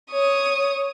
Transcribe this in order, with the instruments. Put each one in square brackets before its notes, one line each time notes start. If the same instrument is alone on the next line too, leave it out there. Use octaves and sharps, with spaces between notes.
[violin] C#5 D#6